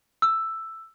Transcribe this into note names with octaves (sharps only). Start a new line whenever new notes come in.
E6